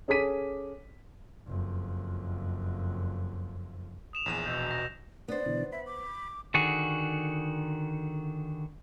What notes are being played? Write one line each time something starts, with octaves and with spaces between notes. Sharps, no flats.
C#4 G#4 A4 D6 B6 D#7
F#1 F2
D#6 E7 F7
A#1 E2 G#4 D#7
B2 E6 G6
A#6
B3 D4 C5 D5
B2 D3 E3
E5 B5
D6
D3 D#3 F#4 G#4